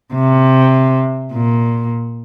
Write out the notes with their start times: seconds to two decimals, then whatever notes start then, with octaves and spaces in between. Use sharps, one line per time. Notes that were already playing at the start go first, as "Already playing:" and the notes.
0.14 C3
1.33 A#2